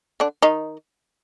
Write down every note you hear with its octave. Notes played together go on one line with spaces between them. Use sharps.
D3 D4
D#3 D#4